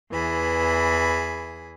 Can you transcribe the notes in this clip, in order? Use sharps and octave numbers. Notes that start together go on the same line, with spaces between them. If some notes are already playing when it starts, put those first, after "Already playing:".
E2 E3 G#4 B5